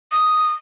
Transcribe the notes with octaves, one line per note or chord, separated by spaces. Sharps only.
D#6